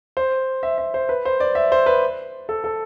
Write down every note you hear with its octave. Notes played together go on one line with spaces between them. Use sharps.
C5
E5
E5
C5
B4
C5
D5
E5
C5
B4
A4
A4